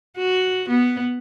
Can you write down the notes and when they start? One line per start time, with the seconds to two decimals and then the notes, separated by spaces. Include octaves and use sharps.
0.18 F#4
0.69 B3